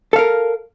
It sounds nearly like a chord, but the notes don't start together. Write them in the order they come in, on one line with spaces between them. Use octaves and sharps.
A4 F5 A#4